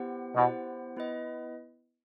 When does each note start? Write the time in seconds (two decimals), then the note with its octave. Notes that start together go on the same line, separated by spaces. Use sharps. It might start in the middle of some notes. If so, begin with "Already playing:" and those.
Already playing: B3 E4 G4 C5 F#5
0.36 B2 B3 E4 G4 C5 F#5
0.97 B3 E4 B4 D#5